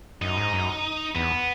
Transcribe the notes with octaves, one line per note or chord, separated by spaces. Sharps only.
F#2 D#4
G#2
F#2
E2 B3